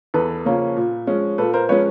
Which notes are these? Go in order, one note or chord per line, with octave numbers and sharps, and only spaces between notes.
E2 A4 B4
C#3 F3 A#3 C#4
A#2
F3 G#3 C#4
A#2 A4 B4
A#4 C5
F3 G#3 C#4 B4 C#5